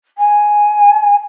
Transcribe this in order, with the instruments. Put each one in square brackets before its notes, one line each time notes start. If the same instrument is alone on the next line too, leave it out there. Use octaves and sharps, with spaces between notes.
[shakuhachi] G#5